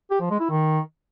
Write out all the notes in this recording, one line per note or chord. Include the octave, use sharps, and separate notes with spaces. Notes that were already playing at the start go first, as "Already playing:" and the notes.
G4
F3
G#3
E4
D#3